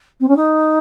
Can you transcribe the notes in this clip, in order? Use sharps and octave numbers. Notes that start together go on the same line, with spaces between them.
C4
C#4
D#4